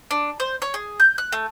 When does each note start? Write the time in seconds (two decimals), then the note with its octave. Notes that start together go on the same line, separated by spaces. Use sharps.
0.11 D4
0.40 C5
0.62 C#5
0.74 G#4
1.00 G6
1.18 F#6
1.32 A3